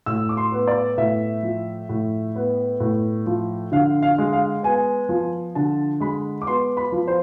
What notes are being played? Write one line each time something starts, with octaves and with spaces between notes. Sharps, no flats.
A2 E6
D6
C6
B3
D5
A2 E5
F3
A2
B3
A2
F3
D3 F5
F5
G#3
F5
B3 G#5
F3
D3 A5
G#3 B5
D6
B3 C6
B5
F3
C5